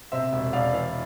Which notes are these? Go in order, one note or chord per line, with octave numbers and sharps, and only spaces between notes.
C3 C5 E5
E1
E1 D5 F5
E3